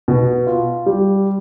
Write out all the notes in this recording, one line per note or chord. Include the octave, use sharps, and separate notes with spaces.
B2
F4
G3